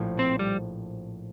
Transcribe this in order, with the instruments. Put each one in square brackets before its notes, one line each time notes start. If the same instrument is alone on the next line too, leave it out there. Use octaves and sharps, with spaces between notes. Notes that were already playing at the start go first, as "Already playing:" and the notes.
Already playing: [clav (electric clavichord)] A#1 A2 F3
[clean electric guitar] C4
G3